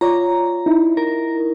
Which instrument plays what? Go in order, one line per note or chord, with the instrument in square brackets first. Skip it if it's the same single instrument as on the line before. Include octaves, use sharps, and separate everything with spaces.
[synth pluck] F4 C#5 D5 [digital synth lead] A#5
[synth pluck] D#4 E4
[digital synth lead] A#4